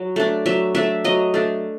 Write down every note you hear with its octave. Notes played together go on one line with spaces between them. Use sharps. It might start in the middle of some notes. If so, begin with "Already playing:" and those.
Already playing: F#3
A3 D4
F#3 E5
A3 D4 E5
F#3 D#5
A3 D4